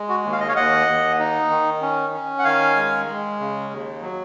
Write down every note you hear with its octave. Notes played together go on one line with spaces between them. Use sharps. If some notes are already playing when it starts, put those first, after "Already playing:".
Already playing: G#3
F#4
D#2
F5
D#5
C#5 F5
D#2 D#5 F#5
D#2
D#4
D#3
C#4
C#4
F#5
D#3 F5 G#5
G#3
G#3
C#3
D#2
F#3